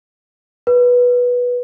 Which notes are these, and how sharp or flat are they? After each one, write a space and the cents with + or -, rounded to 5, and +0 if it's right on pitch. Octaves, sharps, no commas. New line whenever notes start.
B4 -10